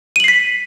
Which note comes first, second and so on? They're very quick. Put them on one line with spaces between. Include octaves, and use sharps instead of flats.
D#7 F#7 C7 B6